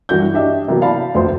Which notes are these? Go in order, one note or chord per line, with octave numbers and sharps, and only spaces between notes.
G2 E3 F#4 G6
D4 G4 D#5 E5
C3 E3 F#3 A#3 B3
D5 F5 A5 B5
F1 D2 F3 B4 C5 C6